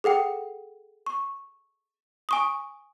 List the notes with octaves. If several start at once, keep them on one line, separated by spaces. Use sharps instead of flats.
G#4 A4 F#5 G5
C#6
G#5 C#6 D#6